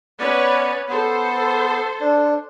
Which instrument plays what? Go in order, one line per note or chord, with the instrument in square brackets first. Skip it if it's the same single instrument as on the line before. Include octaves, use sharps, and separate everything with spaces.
[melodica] B3 D5 [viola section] C#4 B4 C#5
[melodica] B3 [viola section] A4 C5
[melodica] D4